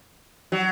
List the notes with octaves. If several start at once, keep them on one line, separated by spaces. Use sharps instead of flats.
F#3